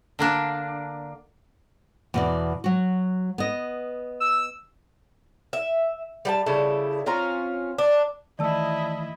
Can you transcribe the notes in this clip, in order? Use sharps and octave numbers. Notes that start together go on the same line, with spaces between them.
D3 A#3 D4
E2 B2 D5
F#3 F#4
B3 D#5
E6
E5
G3 F#5 A5
C#3 G3 E4 A4
C4 C#4 F4 A#5
D4
D#3 E3 A3 E4 D5 D#5 A5 E6